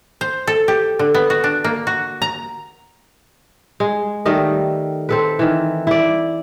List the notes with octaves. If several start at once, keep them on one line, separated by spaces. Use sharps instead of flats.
C5
A4
G4
D3
B3
F#4
D4
A#3
F#4
A#5
G#3
D#3 G3 A3 D#5
C4 A4 B4
D#3 E3
E4 D5